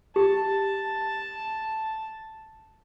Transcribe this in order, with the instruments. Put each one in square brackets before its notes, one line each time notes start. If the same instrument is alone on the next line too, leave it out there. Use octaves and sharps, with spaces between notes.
[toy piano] G4 [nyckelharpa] A5